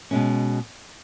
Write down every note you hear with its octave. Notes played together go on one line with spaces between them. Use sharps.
B2 G#3 C#4